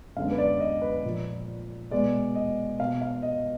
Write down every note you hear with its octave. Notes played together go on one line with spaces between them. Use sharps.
F#2 D3 G#3 B3 F5
B4
D5
D#5
B4
A#2 F3 A#3
B2 G#3 B3 D5
D#5
B2 A#3 F5
F5
D#5